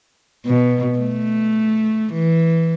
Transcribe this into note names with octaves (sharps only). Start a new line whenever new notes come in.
B2
A3
E3